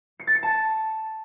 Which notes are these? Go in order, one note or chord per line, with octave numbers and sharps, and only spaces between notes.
C#7
A6
C#7
A5